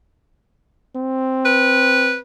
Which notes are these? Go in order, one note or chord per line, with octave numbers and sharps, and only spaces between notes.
C4
B4